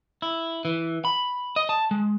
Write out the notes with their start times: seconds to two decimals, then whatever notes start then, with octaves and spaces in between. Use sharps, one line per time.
0.22 E4
0.65 E3
1.05 B5
1.56 D#5
1.69 A5
1.91 G#3